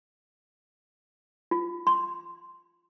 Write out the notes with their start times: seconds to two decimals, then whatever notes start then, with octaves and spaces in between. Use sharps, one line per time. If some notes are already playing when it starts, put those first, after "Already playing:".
1.51 F4
1.87 C6